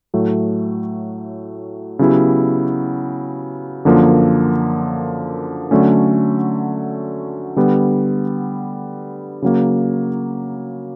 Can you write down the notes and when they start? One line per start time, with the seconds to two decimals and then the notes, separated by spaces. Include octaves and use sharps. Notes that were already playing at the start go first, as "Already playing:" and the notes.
0.14 A2 F#3 A3
1.99 C#3 F#3 B3 E4 G4
3.85 F#2 D3 F3 A#3
5.71 D3 F#3 A3 C#4
7.56 D3 G3 B3
9.42 C#3 F#3 A#3